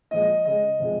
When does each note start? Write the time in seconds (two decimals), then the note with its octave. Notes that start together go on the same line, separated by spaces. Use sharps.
0.11 A#2 F3 G#3 D#5
0.45 C#3 G#3 D#5
0.80 C3 F3 G#3